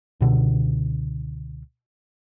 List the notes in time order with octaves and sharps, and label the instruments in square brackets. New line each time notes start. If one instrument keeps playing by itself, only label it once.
[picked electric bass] C#2 B2 D3